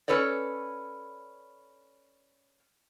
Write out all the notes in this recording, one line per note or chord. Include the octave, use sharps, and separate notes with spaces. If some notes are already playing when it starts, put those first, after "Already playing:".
C#4 A4 B4 C#5 D5